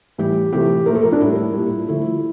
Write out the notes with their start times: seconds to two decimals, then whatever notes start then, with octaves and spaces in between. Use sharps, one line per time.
0.18 A2 E3 G3 G4
0.53 C3 E3 A3 G4
0.86 A#2 F3 A3 A#4
0.95 A4
1.03 A#4
1.12 D4
1.20 A2 G3 E4
1.54 A#2 G3
1.88 D3 F3 A3 E4